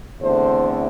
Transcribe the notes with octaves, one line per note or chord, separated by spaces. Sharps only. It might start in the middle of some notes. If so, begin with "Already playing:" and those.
E2 D3 A3 C4 C5